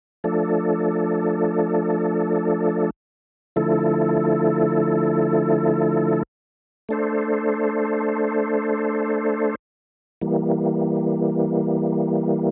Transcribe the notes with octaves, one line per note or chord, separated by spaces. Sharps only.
F3 A3 D4 A4
D3 F3 A3 E4 A4
A3 D4 A4 C5
E3 G3 A#3